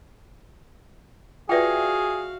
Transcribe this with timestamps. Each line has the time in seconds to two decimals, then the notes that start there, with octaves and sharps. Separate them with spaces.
1.49 F4 F#4 G#4 B4 D5 E5 F5 G5